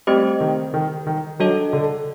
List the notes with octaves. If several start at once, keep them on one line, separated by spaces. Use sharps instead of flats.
G3 A3 C4 G4 C5 D#5
D#3
D#3
D#3
F#3 D4 A4 D#5 A5
D3